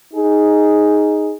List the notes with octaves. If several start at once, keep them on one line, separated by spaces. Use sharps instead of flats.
D#4 G#4